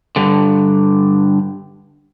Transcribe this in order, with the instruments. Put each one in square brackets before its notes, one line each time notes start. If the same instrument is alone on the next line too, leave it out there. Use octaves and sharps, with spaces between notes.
[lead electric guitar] G2 D3